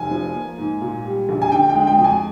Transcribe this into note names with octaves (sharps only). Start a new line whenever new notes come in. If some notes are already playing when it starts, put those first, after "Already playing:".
Already playing: F1 G#5
F3
A#3
G#2
A#2
G3
A#1
G#5
D3 G5
G5
G#3
G5
F2
G#5